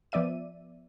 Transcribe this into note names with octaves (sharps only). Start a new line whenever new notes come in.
F3 B3 D5 E5 D#7